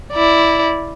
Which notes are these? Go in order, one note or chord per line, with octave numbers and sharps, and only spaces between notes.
E4 D5